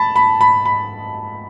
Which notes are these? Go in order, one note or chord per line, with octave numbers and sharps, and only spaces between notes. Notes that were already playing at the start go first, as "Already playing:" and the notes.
Already playing: A5 B5
B5
B5
B5